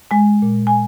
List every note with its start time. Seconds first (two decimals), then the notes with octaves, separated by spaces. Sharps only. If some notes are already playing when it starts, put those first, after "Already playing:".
0.11 G#3 G#5
0.42 A#2
0.67 G#5